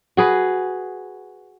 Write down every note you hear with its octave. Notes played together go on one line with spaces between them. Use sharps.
F#4 G#4 B4